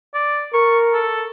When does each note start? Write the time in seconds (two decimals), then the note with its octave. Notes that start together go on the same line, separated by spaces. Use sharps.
0.14 D5
0.53 A#4 C#6
0.94 A4